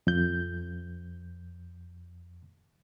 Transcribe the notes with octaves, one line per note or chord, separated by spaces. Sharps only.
F2 G6